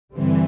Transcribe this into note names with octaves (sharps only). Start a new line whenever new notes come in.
G2 D3 E3 G3 C4